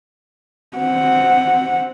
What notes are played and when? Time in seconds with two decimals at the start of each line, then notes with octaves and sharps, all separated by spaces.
0.78 C4 F#5